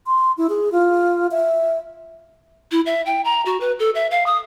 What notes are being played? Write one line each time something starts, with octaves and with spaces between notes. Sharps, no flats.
C6
E4
G#4
F4
E5
E4
E5
G5
A#5
F#4
B4
A4
E5
F5
D#6